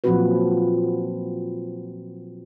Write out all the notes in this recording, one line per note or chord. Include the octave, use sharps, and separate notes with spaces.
A#2 F3 F#3 C4 F#4 B4